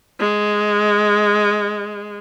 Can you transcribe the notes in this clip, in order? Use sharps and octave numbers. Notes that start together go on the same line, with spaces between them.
G#3